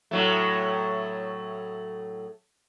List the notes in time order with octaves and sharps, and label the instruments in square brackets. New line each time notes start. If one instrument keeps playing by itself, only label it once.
[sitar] A2 F#3 A3